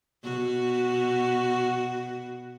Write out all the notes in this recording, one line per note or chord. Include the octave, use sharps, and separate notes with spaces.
B2 F#4